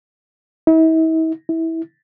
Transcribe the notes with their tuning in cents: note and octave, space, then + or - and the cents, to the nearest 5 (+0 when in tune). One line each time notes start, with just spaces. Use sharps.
E4 -45
E4 -20